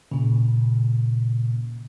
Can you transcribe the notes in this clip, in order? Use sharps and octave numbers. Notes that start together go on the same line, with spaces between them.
A#2 C#3